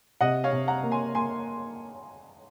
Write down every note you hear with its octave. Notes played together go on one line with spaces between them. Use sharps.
C3 D#5 F#5
C#5 F5
C3
F#5 A#5
A#3
G#5 C6
A#3 G#5 C6